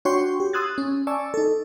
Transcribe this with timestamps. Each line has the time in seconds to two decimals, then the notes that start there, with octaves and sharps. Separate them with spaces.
0.05 D4 F#4 C#5 G5 C6 C#6
0.40 G4
0.53 C6 D#6 E6 F#6 G#6 A6
0.78 C#4
1.07 D5 G#5 A5 C#6 E6
1.34 D#4 A4